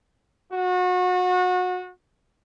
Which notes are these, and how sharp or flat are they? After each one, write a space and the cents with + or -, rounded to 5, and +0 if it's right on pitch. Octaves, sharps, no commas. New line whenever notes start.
F#4 -30